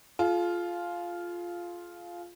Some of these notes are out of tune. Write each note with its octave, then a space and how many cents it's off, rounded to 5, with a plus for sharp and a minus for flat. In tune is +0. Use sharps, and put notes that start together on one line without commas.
F4 +0 G#4 +45